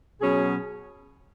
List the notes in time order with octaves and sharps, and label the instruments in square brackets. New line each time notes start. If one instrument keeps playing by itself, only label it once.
[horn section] B2 F#3 C#4 G#4